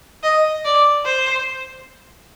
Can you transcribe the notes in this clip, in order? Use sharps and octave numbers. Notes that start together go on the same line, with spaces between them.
D#5
D5
C5